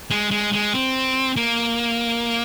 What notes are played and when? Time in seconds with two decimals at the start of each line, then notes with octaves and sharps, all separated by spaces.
0.11 G#3
0.31 G#3
0.53 G#3
0.74 C4
1.36 A#3